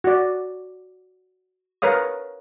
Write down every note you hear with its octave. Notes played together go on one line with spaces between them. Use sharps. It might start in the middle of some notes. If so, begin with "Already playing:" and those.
F#4 D5
A#4 B4 C#5 F5 D#6